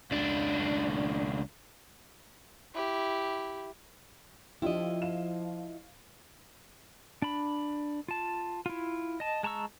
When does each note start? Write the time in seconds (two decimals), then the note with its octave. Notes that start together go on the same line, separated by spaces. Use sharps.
0.11 C#2 D4
2.74 E4 G4
4.62 F3 D4 E4 F4 G4 D#5
5.02 F5 E7
7.22 D4 B5
8.08 F4 A5
8.66 E4 F4
9.20 D#5 A5
9.43 G#3 A5 A#5 C#6 E6